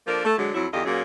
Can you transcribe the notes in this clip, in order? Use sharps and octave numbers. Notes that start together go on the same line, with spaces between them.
F3 A#3 D4 A4 A#4
A3
D3 F#3 G#3
F2 F#3 E4
E2 D3 F4 G4 D#5
A#2 F#3 A#3 C#4 G#4